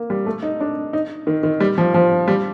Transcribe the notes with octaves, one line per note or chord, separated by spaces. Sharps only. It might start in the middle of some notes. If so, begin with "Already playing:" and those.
Already playing: A#3
G3
A3
D#4
D4
D#4
D#3
D#3
G3
F3
F3
G3